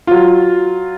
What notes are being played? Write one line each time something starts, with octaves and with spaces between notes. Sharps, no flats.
F#3 F4